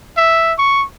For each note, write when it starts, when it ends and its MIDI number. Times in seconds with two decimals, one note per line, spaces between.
0.17 0.53 76
0.58 0.84 85